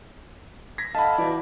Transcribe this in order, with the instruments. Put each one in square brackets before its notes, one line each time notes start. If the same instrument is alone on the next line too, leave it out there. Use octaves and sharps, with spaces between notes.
[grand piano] G#6 A#6 B6
[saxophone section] D3 F5 [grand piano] D#5 [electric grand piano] A5 B5
[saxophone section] B2 D5 [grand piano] E3